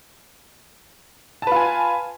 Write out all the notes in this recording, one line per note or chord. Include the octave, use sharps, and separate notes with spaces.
F4 B4 G#5 A5